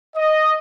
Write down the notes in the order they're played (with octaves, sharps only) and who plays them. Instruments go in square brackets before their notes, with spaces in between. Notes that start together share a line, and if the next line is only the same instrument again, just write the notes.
[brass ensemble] D#5